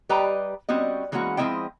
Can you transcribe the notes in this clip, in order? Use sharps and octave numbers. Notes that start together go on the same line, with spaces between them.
G3 G4 B4 D#5 G5 A#5
G3 C4 C#4 F#4 D#5
E3 G#3 A#3 C#4 F#4
F3 G#3 C4 E4 D#5 G5